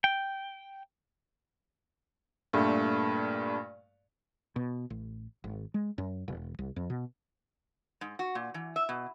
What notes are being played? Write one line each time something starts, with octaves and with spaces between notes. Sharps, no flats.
G5
G2 A#2 A3
B2
A1
G#1
G#3
F#2
E1
C2
F2
B2
G#2
F#4
A#2
E3
E5
B2